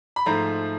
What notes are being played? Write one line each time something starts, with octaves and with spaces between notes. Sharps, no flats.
B5
G#2 F3 A3 A#5